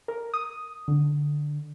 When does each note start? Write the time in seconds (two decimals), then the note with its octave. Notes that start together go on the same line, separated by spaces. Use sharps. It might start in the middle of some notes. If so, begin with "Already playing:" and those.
0.08 A#4
0.34 D#6
0.88 D3